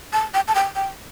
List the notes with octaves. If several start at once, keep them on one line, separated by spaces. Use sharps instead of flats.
A5
G5
A5
G5
G5